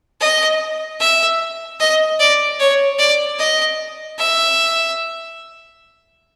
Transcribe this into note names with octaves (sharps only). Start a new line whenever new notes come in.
D#5
E5
D#5
D5
C#5
D5
D#5
E5